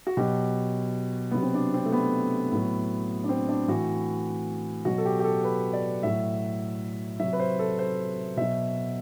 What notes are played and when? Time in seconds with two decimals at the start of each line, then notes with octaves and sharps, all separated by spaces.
0.07 F#4
0.17 B2 F#3 G4
1.31 C3 F#3 B3
1.43 C4
1.54 D4
1.74 C4
1.85 A3
1.92 B3
2.52 A2 F#3
3.24 D4
3.29 C4
3.49 D4
3.68 A2 E3 F#4
4.85 B2 F#3 F#4
4.98 A4
5.05 G4
5.19 G4
5.24 A4
5.44 B4
5.73 D5
6.03 A2 F#3 E5
7.20 C3 F#3 E5
7.33 B4
7.40 C5
7.59 A4
7.79 C5
8.37 B2 F#3 E5